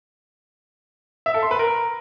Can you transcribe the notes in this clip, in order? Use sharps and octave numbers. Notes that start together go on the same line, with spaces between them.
E5
A4
C6
B4
A#4